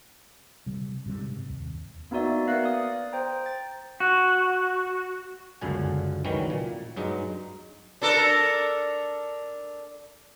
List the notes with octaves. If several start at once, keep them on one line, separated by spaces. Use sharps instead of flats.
C3 G3
G#2 C3 G3
D#2
A#3 B3 D#4 F#4 D5 E5
B3 A#4 F5 F#5 F#6 A#6
D5 D#6
C5 G5 A#5
A6
F#4
G1 C#2 F#2 D3 G#5
C#2 D#3 E3 F#3 G3 C#4
A#2
G2 F#3 G#3 D#4
D4 A4 A#4